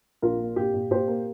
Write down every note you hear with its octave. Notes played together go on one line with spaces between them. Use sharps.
A#1 F4 A#4
A#3
A#2 G4
A#2
A#2 G4 C5
A#3